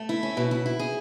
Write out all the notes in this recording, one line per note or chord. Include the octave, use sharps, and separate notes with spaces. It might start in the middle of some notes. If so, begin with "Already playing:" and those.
Already playing: A3
E4
C#4
B2
E4
E4
G#4